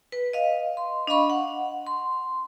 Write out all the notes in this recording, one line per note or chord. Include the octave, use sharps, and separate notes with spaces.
B4
D#5 F5
C6
D4 D#5 F5 B5 C#6
F#5
C6